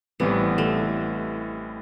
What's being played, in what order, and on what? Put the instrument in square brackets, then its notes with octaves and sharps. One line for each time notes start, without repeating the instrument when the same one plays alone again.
[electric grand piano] A1 A2 E3 G3 C4 [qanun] B3
[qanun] A3